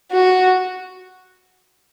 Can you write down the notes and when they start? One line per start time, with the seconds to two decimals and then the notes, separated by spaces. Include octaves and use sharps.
0.12 F#4